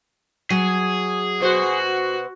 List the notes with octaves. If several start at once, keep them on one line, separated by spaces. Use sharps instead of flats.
F#3 G#4
B2 F#4 C5